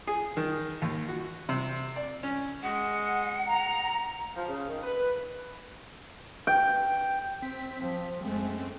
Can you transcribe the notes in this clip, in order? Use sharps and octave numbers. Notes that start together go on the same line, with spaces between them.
G#4
D#3
D#2
F#4
C3
D5
C#4
G#3 F#5
A#5
F3
C#3
D#3
B4
G5
C4 B6
F3
F#2 G#3 A3 C4